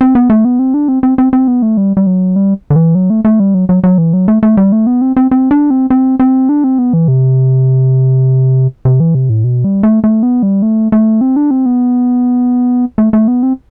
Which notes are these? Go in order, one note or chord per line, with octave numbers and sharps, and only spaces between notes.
C4
B3
A3
B3
C4
D4
C4
C4
C4
C4
B3
A3
G3
G3
F#3
G3
D3
E3
F#3
A3
A3
G3
F#3
F#3
F#3
E3
F#3
A3
A3
G3
A3
B3
C4
C4
C4
D4
C4
C4
C4
D4
C4
B3
E3
C3
C3
E3
C3
A2
B2
G3
A3
A3
B3
G3
A3
A3
C4
D4
C4
B3
A3
A3
B3
C4